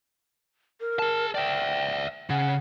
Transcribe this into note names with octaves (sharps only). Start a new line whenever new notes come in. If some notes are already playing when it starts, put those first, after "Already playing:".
A#4
G#4 A5
D5 E5 G5
C#3 F#5